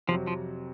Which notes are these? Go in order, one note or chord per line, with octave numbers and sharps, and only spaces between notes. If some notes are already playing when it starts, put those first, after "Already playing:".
F2 C3 F3 F#3
F3